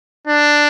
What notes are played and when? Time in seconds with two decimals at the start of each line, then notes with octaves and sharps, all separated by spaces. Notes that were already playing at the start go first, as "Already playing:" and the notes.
0.27 D4